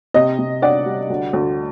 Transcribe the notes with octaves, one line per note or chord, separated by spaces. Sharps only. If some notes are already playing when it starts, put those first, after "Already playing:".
C3 D#5
C3
D4 D5 F#5
G3
D2
D2